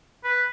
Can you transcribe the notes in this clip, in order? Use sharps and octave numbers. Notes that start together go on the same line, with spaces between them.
B4